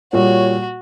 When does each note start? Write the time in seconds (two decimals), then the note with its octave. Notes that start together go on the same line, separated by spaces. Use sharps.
0.13 A#2 G3 F#4 C#5